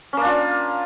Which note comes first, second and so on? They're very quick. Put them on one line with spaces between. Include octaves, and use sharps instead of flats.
C#4 A#3 D4 F4